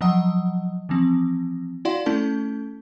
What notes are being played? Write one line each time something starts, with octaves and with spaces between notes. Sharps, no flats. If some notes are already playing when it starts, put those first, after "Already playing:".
F3 F#3 D#5 F#5 D#6
E3 F3 C4
E4 F#4 D5 F5 F#5 C6
A3 C#4 E4 A4 A5